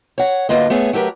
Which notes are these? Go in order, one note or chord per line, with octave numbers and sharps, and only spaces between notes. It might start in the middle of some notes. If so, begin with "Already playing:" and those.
C#5 F#5
D2 A#3 F4 B4 D#5
A3 B3 G#4 C#5
F#3 A3 G4 A#4 B4